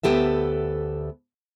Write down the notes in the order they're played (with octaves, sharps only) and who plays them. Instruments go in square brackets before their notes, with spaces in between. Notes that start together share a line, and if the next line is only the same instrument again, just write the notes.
[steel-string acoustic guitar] D2 B3 G4 A4 E5